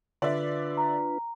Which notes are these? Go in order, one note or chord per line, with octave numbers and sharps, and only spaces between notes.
D3 D4 F4 B4 D5 E5
A#5